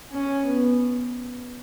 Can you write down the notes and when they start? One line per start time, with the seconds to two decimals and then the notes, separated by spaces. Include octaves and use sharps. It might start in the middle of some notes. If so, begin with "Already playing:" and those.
0.12 C#4
0.46 B3